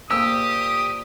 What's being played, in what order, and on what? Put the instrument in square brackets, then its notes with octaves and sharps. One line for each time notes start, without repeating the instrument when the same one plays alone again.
[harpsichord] A#2 C4 [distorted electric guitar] G4 [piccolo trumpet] D#6 [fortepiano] E6